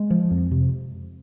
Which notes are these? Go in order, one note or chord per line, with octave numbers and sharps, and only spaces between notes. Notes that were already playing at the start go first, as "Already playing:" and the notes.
Already playing: G#3
F3
F2
C3